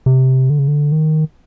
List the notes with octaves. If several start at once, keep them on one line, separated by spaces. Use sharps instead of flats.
C3
D3
C#3
D3
D#3